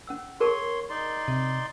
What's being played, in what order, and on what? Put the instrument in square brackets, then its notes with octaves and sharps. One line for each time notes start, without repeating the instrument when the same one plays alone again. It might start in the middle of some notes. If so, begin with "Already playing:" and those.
[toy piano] C#4 F#5 E6
[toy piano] G#4 A#4 A5 [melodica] C#5 C6
[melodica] D#4 D5 C6
[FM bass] C3